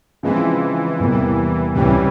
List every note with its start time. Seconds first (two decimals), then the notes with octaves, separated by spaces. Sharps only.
0.23 C#3 E3 F3 G#3 C4
0.99 E2 C3 G3 A#3
1.75 C#2 C3 E3 G3 C#4 G4